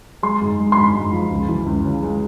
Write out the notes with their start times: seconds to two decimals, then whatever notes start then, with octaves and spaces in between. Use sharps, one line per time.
0.23 G#3 C6
0.41 G#2
0.60 G#3
0.72 C6
0.77 G#2 B5
0.95 G#2
1.13 F3
1.31 C#2
1.49 E3
1.66 C#2
1.85 C#3
2.02 G#3